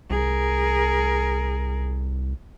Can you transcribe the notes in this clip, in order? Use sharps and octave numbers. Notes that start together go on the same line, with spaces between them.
C2 G#4 A#4